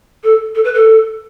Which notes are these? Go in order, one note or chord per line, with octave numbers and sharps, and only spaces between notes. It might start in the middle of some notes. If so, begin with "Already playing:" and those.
A4
A4
B4
A4